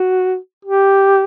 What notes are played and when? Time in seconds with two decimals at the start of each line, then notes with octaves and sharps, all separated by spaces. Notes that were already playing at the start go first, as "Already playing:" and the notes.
Already playing: F#4
0.65 G4